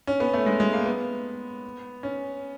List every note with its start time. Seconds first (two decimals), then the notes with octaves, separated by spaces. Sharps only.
0.07 C#4
0.20 B3
0.34 A3
0.46 G#3
0.60 G#3
0.73 A#3
0.86 B3
2.03 C#4